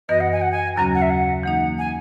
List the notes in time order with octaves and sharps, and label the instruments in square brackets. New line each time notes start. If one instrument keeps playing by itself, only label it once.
[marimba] F#2 E3 B3 F#4 B4 [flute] D#5
[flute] F#5
G#5
F#5
G#5
[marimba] D#2 C#3 F#3 C#4 F#4 [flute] A#5
[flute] F#5
E5
F#5
[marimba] E3 A#3 D#4 [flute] F#5
[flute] G#5